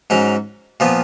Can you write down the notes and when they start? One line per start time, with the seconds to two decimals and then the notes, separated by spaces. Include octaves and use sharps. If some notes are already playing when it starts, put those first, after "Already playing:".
0.10 G#2 F#3 C#4
0.80 A#2 F3 B3